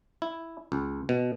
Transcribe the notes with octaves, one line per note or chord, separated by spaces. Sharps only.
E4
C#2
B2